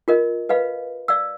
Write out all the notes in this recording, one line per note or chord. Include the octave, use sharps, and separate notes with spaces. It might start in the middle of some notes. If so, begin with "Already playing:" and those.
F4 A#4 D#5
B4 D#5 F5 B5
D5 F5 E6